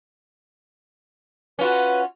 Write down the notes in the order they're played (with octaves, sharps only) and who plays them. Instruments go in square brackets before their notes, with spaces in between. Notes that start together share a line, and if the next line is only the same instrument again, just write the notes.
[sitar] C#4 F4 F#4 [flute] B4